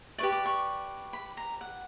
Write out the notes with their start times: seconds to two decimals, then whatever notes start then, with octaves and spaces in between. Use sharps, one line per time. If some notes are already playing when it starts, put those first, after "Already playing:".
0.18 G4 B4 D5 C#6
0.32 D6
0.46 C#6
1.13 B5
1.37 A#5
1.61 F#5